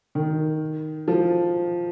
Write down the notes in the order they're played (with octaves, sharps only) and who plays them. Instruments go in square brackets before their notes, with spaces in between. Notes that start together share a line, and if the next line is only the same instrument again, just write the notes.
[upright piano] D#3
F3